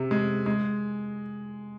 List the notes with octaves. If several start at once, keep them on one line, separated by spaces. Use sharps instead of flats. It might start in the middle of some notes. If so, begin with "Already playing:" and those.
Already playing: C3
G#3
G#3